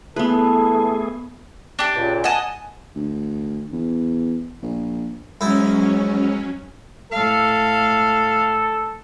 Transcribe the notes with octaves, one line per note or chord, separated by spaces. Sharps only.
E3 A3 B3 G#4 A4 B4
D4 G4
C#2 A#2
D#5 F#5 G#5 A5
D2
E2
A#1
G#2 F#3 C#4 E4
A2 A4 F5